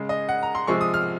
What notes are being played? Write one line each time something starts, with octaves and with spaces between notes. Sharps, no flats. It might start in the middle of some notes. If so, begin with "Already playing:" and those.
Already playing: C#3 G#3
D#5
F#5
A#5
C6
C3 F3 G#3 C#6
D#6
F6